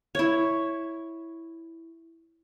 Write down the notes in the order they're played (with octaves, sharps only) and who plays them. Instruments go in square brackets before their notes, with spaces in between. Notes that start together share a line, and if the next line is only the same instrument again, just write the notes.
[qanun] E4 C#5